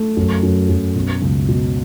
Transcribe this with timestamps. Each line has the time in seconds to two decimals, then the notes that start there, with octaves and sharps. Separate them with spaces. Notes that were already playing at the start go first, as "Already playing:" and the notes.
Already playing: A3
0.17 F#2
0.43 F#2
0.69 F#2
0.95 B2
1.22 C#2
1.48 B2